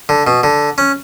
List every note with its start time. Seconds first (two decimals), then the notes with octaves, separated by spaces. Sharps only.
0.09 D3
0.27 B2
0.43 D3
0.78 C#4